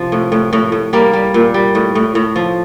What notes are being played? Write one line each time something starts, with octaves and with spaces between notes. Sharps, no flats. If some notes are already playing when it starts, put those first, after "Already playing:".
Already playing: C3 F3
A2
A2
A2
A2
G3 A#3
G3
A#2
G3
A2
A2
A2
F3